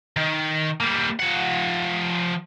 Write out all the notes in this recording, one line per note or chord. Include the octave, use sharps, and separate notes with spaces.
D#3
G3 A#3
F3 F#5